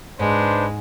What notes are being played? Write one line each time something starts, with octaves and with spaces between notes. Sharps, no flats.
G#2 G#3 D4 B4 C5